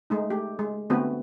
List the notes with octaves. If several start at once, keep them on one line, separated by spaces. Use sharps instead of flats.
G#3 A3 D#4
A3 G4
G#3
D3 A3 B3 C4 F#4 B4